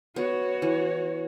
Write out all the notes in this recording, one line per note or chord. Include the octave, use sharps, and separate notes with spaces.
B3 F#4 C#5
E3